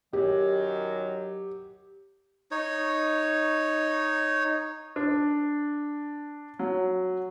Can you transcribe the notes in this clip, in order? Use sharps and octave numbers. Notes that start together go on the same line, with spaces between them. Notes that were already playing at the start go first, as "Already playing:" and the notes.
F#2 D#3 F#3 G4
D#4 C#5
D4
F#3